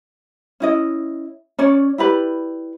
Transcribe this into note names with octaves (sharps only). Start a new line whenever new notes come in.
C#4 E4 D#5
C#4 C#5 D5
E4 G4 B4 D5